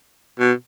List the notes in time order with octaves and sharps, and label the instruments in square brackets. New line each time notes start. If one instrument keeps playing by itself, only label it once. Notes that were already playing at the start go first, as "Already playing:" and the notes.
[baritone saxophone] B2